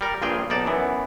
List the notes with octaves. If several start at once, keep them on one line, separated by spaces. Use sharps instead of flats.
G3 A#4
A#1 G2 A#2 F4 G#4 G5
B1 D#4 D5 A5
F#2 E3 B3